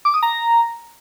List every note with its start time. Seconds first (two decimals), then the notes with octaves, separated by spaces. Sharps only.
0.05 D6
0.14 D#6
0.23 A#5